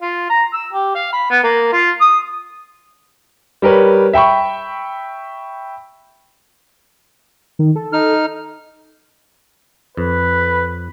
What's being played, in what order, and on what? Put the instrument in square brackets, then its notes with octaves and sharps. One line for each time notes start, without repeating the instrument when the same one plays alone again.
[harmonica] F4
A#5
E6
G4
F5
B5
B3
A#3
F4
D#6
[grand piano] G3 G4 A#4 B4 C#5
E5 G5 B5 C#6
[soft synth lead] D#3
A4
[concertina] D#4 F6
[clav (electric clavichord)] F2 [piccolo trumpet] B4